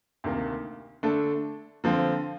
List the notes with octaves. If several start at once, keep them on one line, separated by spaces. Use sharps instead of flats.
D2 C3 D#3 A#3
D3 A3 D4 A4
D3 F3 C4